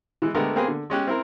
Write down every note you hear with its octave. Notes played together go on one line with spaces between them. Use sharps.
E3 G#3
D3 G#3 A3 B3 G4 A#4
A#3 C4 G4 G#4 B4 G#5
D3
G#3 C#4 G4 F#6
C4 E4 A#4